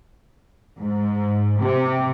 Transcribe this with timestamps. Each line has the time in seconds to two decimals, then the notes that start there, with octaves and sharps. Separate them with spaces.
0.78 G#2
1.58 C3